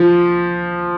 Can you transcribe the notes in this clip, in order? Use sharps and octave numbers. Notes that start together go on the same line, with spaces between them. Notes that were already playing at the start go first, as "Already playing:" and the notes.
Already playing: F3